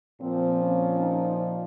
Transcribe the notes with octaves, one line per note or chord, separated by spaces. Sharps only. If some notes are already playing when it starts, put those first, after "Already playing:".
A#2 F3 C4
C#4
D#4